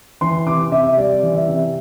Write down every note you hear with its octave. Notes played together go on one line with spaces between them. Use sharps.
E3 C6
C3 D6
C3 E5
G3 D5
E3
E5
C3